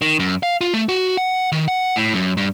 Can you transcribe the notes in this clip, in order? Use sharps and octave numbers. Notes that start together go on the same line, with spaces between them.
D#3
F#2
F5
F4
A3
F#4
F#5
D#3
F#5
A2
F#2
G2